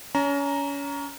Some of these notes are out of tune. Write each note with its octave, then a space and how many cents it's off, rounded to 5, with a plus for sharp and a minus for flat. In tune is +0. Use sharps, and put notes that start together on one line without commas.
C#4 +30 A#5 +0